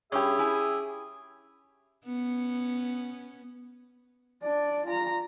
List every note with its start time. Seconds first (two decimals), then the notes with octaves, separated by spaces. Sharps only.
0.12 G2 C#4 G4 G#4 E5
0.39 E4 G#5
2.05 B3 C#4
4.43 D4 D5
4.86 F4 A#5